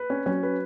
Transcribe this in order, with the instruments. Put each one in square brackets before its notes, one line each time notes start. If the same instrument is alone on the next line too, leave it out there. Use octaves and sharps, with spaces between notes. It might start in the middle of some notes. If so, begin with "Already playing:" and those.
Already playing: [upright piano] B4
C#4
[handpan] F#3 [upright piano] C#4
[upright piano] B4